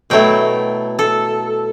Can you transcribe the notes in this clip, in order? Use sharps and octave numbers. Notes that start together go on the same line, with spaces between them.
B2 F#3 A3 E4 G5
A4